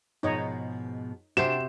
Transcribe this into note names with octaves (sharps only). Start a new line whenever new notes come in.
G#2 B2 F3 D#4 C#5 D#5
C3 D4 F#4 G4 C5 E7